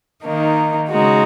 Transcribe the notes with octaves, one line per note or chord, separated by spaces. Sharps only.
D#3 A#3 D#4
C#3 G#3 D#4 F#4